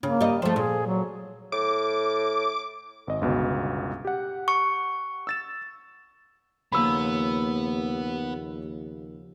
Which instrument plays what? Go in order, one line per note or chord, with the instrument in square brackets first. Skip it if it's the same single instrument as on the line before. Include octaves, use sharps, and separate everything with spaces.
[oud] C#3 [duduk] A#3
[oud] G3 D#5
[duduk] F3 [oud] A3 C5
[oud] A#2 [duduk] G#4
[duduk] F#3
[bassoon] A2 [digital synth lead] D6
[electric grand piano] G#1 D#5
G1 C#2 B2
G4 F#5
[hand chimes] C#6
[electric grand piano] E6 A6 E7
[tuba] D#2 [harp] C#3 F3 A#3 [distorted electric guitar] B3 [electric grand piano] B5 E6